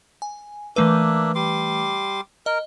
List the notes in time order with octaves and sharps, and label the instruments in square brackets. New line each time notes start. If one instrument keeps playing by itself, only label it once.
[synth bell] G#5
[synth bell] E3 A3 B4 [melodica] A#3 D4 E5
[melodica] G3 C6 D6
[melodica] A#4 [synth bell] D#5